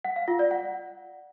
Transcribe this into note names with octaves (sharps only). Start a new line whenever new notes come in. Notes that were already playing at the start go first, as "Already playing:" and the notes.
F#5
F5
F4
D5
F#5